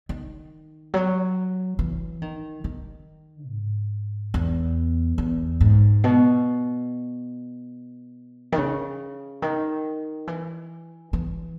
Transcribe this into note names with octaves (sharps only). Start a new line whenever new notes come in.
D#3
F#3
E3
D#3
D#3
G#2
E2
E2
G#2
B2
D#3
C#3
D#3
E3
E3